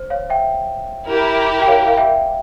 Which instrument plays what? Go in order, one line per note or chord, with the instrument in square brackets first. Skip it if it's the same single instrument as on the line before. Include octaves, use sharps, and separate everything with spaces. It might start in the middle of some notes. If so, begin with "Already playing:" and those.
Already playing: [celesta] C5
C#5 F5
E5 G5
[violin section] E4 G4 A#4
[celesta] G5
C#5 F5
F5
E5 G5